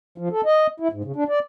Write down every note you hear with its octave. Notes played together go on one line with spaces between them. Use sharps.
F3
A4
D#5
E4
G#2
C#3
D4
D5